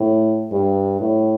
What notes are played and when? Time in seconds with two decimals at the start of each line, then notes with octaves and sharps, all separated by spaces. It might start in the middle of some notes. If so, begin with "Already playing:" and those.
Already playing: A2
0.52 G2
1.00 A2